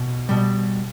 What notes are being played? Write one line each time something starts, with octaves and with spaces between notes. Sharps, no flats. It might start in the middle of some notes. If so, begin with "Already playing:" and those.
Already playing: B2
B2 G3